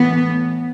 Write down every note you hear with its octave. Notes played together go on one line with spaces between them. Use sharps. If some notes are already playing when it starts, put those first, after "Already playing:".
Already playing: A2 E3 B3